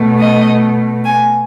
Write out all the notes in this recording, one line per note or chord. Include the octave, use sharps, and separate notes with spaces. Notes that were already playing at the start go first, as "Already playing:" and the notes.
Already playing: B2 A3
D#5
G#5